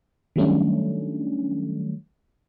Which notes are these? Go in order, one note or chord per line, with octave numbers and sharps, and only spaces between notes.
D#3 F#3 G3 A3 C#4 D4